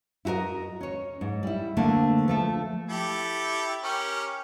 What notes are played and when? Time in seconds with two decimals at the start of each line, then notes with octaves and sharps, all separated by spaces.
0.25 E4 F#4 G4 A#4 D#5
0.81 C#4 C#5
1.21 G#2
1.43 G3 E4
1.77 D3 A3 A#3 C4 C5
2.28 F3 A3 A4
2.89 E4 G4 A4
3.83 C#4 G4 A#4